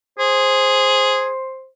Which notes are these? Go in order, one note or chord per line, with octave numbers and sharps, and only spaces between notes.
G#4 C5